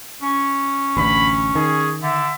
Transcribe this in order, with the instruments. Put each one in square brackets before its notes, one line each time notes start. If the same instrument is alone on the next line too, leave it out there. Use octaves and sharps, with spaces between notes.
[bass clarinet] C#4
[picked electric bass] A1 D2 [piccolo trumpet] B5
[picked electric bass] D#3 [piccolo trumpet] G#4
[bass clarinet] D3 [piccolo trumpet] E5